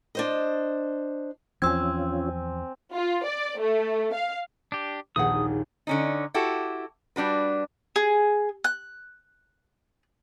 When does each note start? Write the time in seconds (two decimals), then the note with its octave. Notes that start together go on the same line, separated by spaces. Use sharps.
0.15 D4 C5 D#5
1.62 E2 F3 C4 C#4 F4 G#5 E6 G#6
2.93 F4
3.26 D5
3.60 A3
4.14 F5
4.72 D4 G4
5.16 A#1 D#2 G#4 B4 F#5 D#6
5.87 D3 C#4 D#4
6.34 E4 F#4 G4 A4
7.16 G3 D4 F#4 B4
7.96 G#4
8.64 F#6